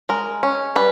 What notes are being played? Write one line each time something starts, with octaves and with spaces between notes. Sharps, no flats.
G#3 A#4
C#4
G3 B4